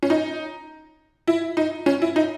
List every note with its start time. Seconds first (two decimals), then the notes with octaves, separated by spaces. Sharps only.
0.03 C#4
0.10 D#4
1.27 E4
1.57 D#4
1.86 C#4
2.02 E4
2.16 D#4